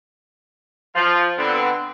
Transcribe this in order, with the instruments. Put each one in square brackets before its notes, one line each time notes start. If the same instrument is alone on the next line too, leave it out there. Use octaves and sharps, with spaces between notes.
[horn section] F3 F4
D3 B3 C4